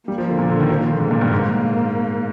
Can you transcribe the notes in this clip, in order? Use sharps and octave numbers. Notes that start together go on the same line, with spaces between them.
G3 A#3
F3
D3
A#2
D3
D#3
F3
D3
G#2 A#3
A#2
G2
G#2 A#3